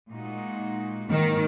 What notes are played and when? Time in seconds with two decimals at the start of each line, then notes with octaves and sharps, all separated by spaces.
0.10 A#2 G#3 D#4 F#4
1.10 G#2 D#3 F#3 A#3